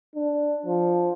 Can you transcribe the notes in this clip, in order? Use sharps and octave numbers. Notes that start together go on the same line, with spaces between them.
D4
F3